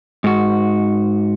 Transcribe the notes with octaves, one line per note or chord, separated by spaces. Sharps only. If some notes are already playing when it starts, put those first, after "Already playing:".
G#2 F#4